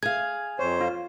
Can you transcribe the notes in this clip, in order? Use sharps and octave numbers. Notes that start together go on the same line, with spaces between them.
G#4 F5 G#6
F2 C5 C#5
F4